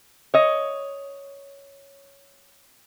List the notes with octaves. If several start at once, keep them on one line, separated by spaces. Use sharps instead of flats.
C#5 D#5